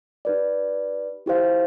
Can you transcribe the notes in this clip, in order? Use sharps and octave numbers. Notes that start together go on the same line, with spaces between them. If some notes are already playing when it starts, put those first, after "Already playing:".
D#4 G4 B4 D5
E4 G4 C5 F5